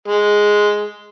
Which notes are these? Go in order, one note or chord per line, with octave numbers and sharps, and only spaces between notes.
G#3